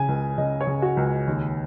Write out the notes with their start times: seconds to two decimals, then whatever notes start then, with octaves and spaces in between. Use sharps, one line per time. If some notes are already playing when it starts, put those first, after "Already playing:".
Already playing: C#3 G#5
0.08 C#2
0.38 C#3 D#5
0.61 C#5
0.67 C#3
0.82 F#4
0.97 C#2
1.27 D#2